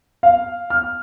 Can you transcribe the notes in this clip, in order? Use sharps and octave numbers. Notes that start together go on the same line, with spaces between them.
F5
F6